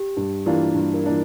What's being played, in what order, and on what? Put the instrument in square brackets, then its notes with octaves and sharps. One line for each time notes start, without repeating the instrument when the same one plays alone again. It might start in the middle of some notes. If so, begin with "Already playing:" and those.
Already playing: [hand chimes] G4
[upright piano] G2
E3 A#3 D4 F4
G2
[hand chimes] G4 A#4
[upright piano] E3 A#3 D4 F4